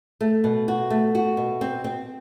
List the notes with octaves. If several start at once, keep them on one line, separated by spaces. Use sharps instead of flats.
A3
B2
F#4
A3
F#4
B2
C4
C4